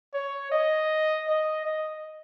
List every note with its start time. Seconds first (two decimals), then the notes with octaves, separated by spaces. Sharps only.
0.14 C#5
0.52 D#5
1.27 D#5
1.65 D#5